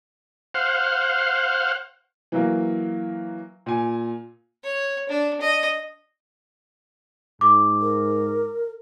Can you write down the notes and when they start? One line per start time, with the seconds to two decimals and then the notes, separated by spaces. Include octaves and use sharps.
0.54 C5 F5 F#5
2.32 E3 F#3 A#3
3.66 A#2 G#5
4.64 C#5
5.09 D4
5.41 D#5
7.41 G#2 D6
7.81 A#4